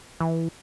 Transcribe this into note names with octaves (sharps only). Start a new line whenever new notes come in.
E3